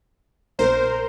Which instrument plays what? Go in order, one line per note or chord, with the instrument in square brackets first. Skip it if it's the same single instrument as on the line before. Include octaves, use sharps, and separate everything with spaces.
[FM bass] A#1 [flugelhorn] A#4 [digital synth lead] C5